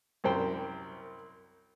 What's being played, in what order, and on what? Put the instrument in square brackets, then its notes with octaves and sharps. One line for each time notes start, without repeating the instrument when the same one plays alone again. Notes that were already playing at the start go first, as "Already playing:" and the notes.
[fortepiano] C2 F#2 C5 G5